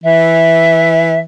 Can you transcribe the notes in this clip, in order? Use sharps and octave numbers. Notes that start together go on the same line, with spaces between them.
E3 E5